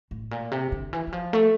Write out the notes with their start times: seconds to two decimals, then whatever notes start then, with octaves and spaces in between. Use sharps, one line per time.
0.11 A2
0.31 A#2
0.51 C3
0.72 D3
0.93 E3
1.07 E3
1.13 F3
1.33 A3